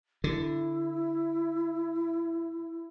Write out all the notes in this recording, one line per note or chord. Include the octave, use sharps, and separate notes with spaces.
D3 E4